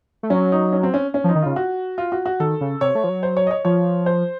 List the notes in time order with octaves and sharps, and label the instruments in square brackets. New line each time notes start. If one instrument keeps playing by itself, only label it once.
[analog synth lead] A3
[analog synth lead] F#3 [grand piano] C#4
[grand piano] D#4
C#4
C4
C#4
C#4
[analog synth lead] F3
[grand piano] D#4
[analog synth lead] D#3
[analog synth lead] C#3 [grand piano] F4
[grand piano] F#4
F4
F#4
F#4
[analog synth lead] D#3 [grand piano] A4
[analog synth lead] C#3
[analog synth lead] C3 [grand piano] C#5
[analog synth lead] A3
F3
F#3
[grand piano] C5
C#5
D#5
C#5
[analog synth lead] F3 [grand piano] C#5
[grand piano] C5